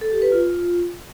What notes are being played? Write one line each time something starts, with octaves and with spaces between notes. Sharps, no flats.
A4
G4
B4
F4